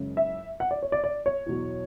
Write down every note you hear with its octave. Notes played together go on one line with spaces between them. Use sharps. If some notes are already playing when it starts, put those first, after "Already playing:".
Already playing: F#1 F#2 C#3 G#3
E5
F#5
D5
C#5
D5
D5
C#5
E2 B2 F#3